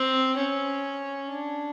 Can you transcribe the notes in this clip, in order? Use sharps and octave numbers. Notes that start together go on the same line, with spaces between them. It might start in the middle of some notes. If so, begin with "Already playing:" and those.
Already playing: C4
C#4
D4